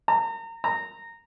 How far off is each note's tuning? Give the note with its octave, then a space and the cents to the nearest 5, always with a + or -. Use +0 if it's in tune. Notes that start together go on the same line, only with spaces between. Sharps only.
A#5 -35
A#5 -15